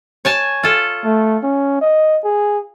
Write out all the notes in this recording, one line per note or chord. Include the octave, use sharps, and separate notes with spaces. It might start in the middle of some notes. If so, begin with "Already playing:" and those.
C#5 G#5 A5
F4 A4
A3
C#4
D#5
G#4